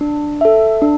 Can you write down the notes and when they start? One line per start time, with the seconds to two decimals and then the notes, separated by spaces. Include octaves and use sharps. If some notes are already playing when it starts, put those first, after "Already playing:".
0.01 D4
0.41 A4 E5
0.82 D4